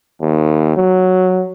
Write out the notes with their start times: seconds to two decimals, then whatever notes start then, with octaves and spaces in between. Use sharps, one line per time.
0.22 D#2
0.77 F#3